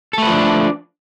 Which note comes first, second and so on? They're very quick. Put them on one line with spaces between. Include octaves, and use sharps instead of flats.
A4 A3 B4 F3 D4